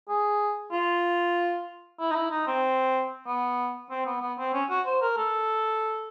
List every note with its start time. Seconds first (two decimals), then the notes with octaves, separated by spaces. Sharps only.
0.08 G#4
0.72 F4
2.00 E4
2.11 D#4
2.15 E4
2.31 D#4
2.47 C4
3.27 B3
3.90 C4
4.06 B3
4.22 B3
4.38 C4
4.53 C#4
4.70 F#4
4.86 C5
5.02 A#4
5.17 A4